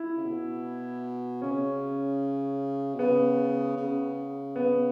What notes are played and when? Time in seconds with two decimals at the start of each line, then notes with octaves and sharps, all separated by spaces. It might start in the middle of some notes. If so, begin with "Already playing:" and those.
Already playing: E4
0.17 C#3
0.25 B2
1.42 C#3 C#4
2.94 B2
2.99 C#3 B3
3.77 C#3
4.56 B3